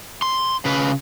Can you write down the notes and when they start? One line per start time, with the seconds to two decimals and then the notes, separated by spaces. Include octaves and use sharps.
0.22 C6
0.65 C#3 B4